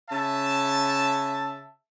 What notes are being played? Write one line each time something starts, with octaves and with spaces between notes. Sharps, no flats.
C#3 E5 A5